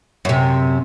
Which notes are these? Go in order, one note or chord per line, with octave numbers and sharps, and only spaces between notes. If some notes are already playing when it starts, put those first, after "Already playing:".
F#2 C3